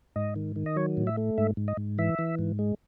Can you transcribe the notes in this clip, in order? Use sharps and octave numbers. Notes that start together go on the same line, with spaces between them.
G#2 D#5
D#3
D#3
D#5
F#3 C#5
A2
E5
A3
G#2 E5
G#2
D#5
G#2
E3 E5
E3
G#2
G#3